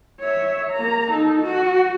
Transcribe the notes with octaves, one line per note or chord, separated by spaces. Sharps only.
C#5 E5
A#3 A#5
D#4 A4
F#4